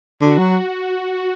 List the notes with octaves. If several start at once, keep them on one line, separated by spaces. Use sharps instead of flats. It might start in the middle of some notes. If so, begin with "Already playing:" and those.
D3 F#4
F#3
F#4